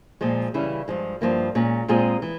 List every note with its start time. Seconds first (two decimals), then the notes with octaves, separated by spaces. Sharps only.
0.21 A#2 F3 G#3
0.54 C#3 E3 G3 C#4 E4
0.88 G2 F3 G#3
1.21 G2 F3 A#3 E4
1.55 A#2 G#3 C#4
1.88 A#2 G#3 C4 F4 G#4
2.22 E3